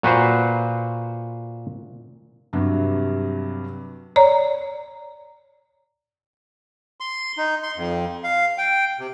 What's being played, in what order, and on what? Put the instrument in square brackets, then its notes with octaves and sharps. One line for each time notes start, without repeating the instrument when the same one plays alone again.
[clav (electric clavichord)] A#2 F#4 B4 C5
[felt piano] G2 C3 F#3
[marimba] C#5 D5 A#5
[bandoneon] C6
D#4
C6
F2
F5
G5
C3